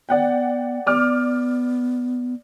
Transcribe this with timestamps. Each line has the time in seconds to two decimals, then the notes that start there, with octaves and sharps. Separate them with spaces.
0.09 B3 D5 F#5 G5
0.86 B3 D5 D6 F6